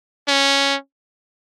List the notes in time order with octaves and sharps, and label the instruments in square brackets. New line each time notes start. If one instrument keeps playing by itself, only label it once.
[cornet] C#4